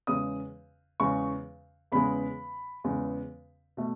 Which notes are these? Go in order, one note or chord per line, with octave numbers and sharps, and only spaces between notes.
E2 C#3 G#3 D#6
E2 C#3 G#3 C#6
E2 C#3 G#3 B3 B5
E2 C#3 G#3 B3
B2 A3